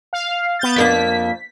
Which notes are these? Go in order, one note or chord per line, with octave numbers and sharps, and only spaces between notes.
F5
B3 G6 A6
F2 A#3 D4 B6